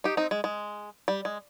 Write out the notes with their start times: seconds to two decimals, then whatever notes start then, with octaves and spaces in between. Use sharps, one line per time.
0.04 D#4 G4
0.17 C4 D#4
0.31 G#3
0.44 G#3
1.08 G3
1.25 G#3